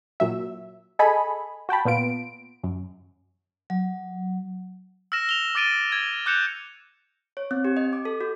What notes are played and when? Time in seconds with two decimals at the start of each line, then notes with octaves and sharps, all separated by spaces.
0.20 A#2 F#3 E5
0.99 G#4 A4 D#5 G#5 B5
1.69 F#4 G5 A5 B5
1.85 A#2 B3 F4 D7
2.64 F#2
3.70 F#3
5.12 E6 F6 A#6 E7
5.29 F7 G7
5.55 D6 E6 A6 D7 D#7 G7
5.92 G#6
6.26 D6 F#6 G6 C#7 E7 F7
7.37 C#5
7.51 C4
7.65 G4
7.77 D#5
7.93 D6
8.05 A4
8.21 F#4